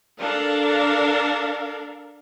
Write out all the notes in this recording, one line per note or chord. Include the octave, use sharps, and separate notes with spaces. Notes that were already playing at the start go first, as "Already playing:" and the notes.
D4 A4 A#4 F5